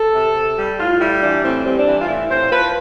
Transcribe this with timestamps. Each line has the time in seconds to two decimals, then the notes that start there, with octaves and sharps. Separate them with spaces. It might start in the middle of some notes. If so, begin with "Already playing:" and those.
Already playing: A4
0.14 C3
0.35 C3
0.58 G3
0.78 A2 F4
1.00 G3 E4
1.22 E3 D4
1.43 A2 C4
1.65 G3 C4
1.76 D4
1.86 E3
2.01 F4
2.08 A2 E4
2.30 A2 C5
2.52 F3 B4